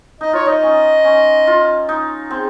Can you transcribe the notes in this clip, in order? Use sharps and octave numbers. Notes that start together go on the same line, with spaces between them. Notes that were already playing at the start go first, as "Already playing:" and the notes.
D#4 D#5
F4 C#5
D#4 D#5
C#4
C#4
F4
D#4
C4 G#4